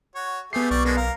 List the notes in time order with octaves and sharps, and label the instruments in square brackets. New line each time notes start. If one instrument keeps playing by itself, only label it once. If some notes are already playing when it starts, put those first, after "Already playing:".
[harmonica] F#4 C#5
[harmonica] A3 G4 G#4 [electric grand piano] B3 C7
[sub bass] B1 [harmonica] G3 D5 C#6
[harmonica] G#3 A#3 D4 [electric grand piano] B3
[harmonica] A#4 [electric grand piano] F5